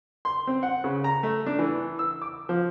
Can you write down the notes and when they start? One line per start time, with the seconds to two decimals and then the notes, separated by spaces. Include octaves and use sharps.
0.25 C6
0.47 C4
0.63 F#5
0.84 C#3
1.04 A#5
1.23 A3
1.46 D4
1.59 E3
1.99 E6
2.22 D6
2.49 F3